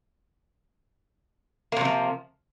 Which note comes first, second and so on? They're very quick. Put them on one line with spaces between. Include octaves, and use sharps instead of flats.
A#3 C3 F#3 F3